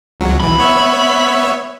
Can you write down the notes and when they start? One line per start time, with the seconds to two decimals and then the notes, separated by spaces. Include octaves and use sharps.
0.20 C#2 F#3
0.40 B1 E3 B5
0.59 B3 C#5 E5